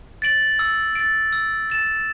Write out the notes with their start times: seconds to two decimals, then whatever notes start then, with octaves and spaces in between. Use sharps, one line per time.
0.22 A6 D7 F#7
0.59 E6
0.95 A6 D7
1.33 E6
1.70 A6 E7